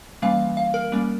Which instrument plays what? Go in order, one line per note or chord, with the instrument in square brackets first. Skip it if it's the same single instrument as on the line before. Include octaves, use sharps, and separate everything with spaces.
[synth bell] E3 G3 A#3 C#4 F5
F5
A#4
G3 A#3 C#4